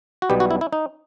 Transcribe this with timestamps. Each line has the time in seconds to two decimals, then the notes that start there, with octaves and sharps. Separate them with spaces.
0.22 F#4
0.30 B1 B2 G3 B3 G4
0.40 F#4
0.51 E4
0.61 E4
0.73 D#4